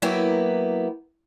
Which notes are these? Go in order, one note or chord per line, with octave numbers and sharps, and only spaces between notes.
F#3 A#3 B3 E4 G4